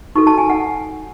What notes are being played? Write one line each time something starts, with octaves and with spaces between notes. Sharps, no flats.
D#4 F#4 A4 C#6
A5
G#5
F#5